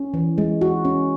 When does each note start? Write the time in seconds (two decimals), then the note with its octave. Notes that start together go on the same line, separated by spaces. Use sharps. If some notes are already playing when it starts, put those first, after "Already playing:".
Already playing: C#4
0.14 E3
0.38 G#3
0.61 F#4
0.85 C#4